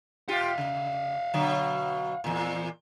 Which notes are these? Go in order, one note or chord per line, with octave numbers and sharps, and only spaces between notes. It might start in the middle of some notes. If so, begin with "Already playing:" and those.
F4 G4 F5 F#5
C#3
B2 D3 F#3
E2 A#2